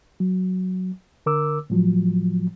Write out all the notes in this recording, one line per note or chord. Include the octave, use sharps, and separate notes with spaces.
F#3
D3 A#4 D6 E6
A2 F3 F#3